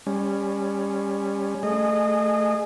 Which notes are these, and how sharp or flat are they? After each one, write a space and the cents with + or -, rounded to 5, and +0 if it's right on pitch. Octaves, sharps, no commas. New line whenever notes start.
G3 +25 C#4 +0
A3 +0 G#4 +0 D#5 -30